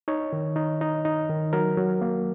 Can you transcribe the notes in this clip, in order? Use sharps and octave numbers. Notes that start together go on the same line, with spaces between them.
D#4 C#5
D#3
D#4
D#4
D#4
D#3
F#3 A#4
F#3
A#3